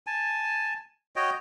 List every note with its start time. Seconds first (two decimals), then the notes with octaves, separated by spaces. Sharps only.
0.07 G#5 A5
1.16 F#4 C#5 D#5 G5